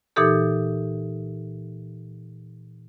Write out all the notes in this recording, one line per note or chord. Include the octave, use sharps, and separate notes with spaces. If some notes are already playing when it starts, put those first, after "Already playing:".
A#2 E3 D#4 G4 A4